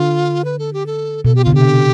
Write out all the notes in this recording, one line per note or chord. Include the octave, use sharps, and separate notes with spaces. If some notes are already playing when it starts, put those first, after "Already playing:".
Already playing: D3 F4
B4
A4
G4
A4
B2 A4
G4
D3 F4
C3 G4